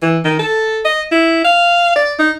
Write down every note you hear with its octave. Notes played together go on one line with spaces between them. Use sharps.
E3
D#3
A4
D#5
E4
F5
D5
D#4